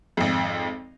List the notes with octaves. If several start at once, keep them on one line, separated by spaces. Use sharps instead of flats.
G#1 F2